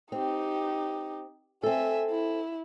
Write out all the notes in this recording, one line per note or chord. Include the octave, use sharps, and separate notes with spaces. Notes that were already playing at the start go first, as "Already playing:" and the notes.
C4 D#4 G4
C4 A4 E5 G#5
E4